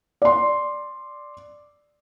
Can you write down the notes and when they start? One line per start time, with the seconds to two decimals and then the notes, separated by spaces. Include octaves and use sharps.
0.22 D5 C6